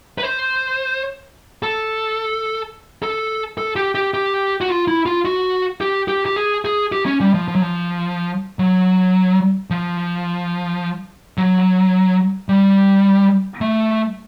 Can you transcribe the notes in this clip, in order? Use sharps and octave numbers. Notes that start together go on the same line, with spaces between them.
B4
C5
A4
A4
A4
G4
G4
G4
F#4
F4
E4
F4
F#4
G4
G4
G4
G#4
G#4
G4
C#4
G3
F3
F3
F#3
F3
F#3
F3
F#3
G3
A3